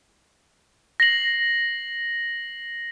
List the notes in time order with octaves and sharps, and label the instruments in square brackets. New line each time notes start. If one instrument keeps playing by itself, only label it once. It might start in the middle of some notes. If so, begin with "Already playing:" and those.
[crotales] A#6 C7 F#7